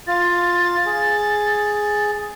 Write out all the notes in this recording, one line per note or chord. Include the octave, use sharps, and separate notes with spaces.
F4 A6
G#4